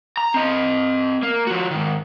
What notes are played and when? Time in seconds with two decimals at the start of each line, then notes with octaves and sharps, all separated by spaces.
0.18 A#5
0.34 C4 D#5
1.23 A#3
1.47 F3 F#4
1.71 G#2 D#3